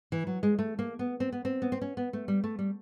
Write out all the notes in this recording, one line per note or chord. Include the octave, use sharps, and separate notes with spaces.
E3
F#3
G#3
A3
A#3
B3
C4
B3
C4
B3
C4
C#4
B3
A3
G3
A3
G3